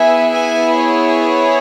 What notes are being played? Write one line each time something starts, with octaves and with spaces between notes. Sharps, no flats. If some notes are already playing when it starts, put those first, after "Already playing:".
Already playing: B3 E4 G#4 E5 G#5
E5 G#5
C#5